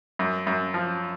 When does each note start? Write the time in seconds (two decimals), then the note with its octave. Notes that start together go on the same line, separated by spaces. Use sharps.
0.19 F#2
0.47 F#2
0.74 F3